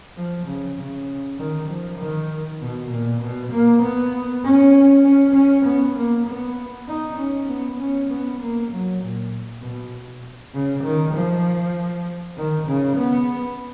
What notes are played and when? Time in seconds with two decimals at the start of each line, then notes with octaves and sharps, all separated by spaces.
0.17 F3
0.47 C#3
0.77 C#3
1.39 D#3
1.69 F3
1.99 D#3
2.61 B2
2.92 A#2
3.22 B2
3.52 A#3
3.83 B3
4.44 C#4
5.04 C#4
5.35 C#4
5.65 B3
5.97 A#3
6.27 B3
6.88 D#4
7.18 C#4
7.48 B3
7.80 C#4
8.10 B3
8.41 A#3
8.72 F#3
9.02 A#2
9.62 B2
10.54 C#3
10.84 D#3
11.14 F3
12.37 D#3
12.68 C#3
12.98 B3